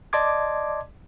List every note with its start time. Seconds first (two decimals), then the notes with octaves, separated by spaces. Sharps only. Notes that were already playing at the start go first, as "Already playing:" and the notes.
0.13 D5 D#5 A5 C6 D6 G#6